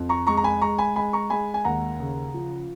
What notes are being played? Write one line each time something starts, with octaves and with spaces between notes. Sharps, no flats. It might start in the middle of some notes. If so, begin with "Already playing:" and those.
Already playing: F2
A#5 C#6
G#3 A#5 C#6
A#5
G#5 B5
G#3 A#5 C#6
G#5 B5
G#3 G#5 B5
A#5 C#6
G#3 G#5 B5
G#5
D#2 F#5 A#5
C#3
F3